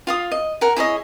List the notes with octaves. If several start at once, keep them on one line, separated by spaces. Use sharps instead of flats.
F4 F5 D#6
D#5
A#4 F#5 G#5
E4 G#4 C#5 D#5